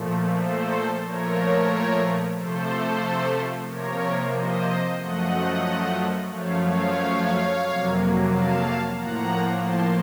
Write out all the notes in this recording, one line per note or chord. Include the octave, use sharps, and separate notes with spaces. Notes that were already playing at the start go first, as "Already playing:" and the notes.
Already playing: A#2 F3 A3
A4 C5
A#2 F3 A3 A#4 C#5
C3 F3 A3 A4 C5
C3 F3 A#3 A#4 C#5
C5 D#5
F#2 F3 A3 D#5 F#5
F#2 F3 A3 C#5 F5
C#5 F5
F2 C3 F#3 A#3
F5 A5
A2 F3 A#3 F#5 A#5
A5 C6